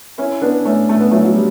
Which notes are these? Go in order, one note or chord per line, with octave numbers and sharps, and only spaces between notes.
C#4 E4
B3 D4
A3 C#4
A3
B3
F#3 A3
F#3
G3